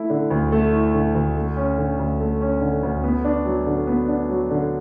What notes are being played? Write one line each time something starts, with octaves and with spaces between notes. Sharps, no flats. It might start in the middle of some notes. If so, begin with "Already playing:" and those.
Already playing: A3 E4
D3
D2
A3
E4
D3
D2
A3
C#4
D3
D2
A3
C#4
D3
D2
B3
D4
F#3
D3
B3
D4
F#3
D3